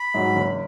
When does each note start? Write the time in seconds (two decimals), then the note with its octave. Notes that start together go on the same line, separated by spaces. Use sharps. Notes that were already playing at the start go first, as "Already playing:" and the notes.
Already playing: B5
0.14 G#2 F#3
0.36 F#1